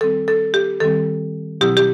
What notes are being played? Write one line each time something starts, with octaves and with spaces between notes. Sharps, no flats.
D#3 G3 C4 A4
A4
G4
D#3 G3 C4 A4
B2 F#3 C4 E4 G4
G4